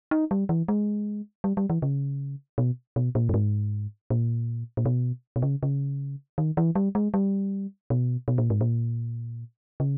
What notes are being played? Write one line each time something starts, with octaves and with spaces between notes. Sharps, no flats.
D#4
G3
E3
G#3
G3
G3
E3
C#3
B2
B2
A#2
G2
G#2
A#2
A#2
B2
B2
C#3
C#3
D#3
E3
G3
G#3
G3
B2
B2
A#2
G#2
A#2
C#3